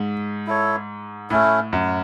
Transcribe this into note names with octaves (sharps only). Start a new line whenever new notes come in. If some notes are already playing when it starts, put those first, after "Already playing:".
Already playing: G#2
E4 A4 C#5
A2 A3 C#4 E4
F#2